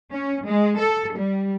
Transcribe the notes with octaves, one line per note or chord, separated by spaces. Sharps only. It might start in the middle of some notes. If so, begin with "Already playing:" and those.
C#4
G#3
A4
G3